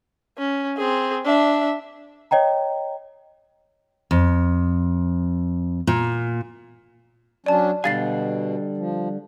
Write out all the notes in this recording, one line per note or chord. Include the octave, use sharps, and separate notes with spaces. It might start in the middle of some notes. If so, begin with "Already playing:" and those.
C#4
C4 G#4
D4 E5
C#5 D#5 G5 A#5
F2
A#2
F#3 C#4 D4 D5 A5
B2 D3 G3 F5 G#5 A6 C7
F3